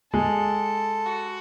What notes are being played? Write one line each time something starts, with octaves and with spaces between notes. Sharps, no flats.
G#3 A4
F#4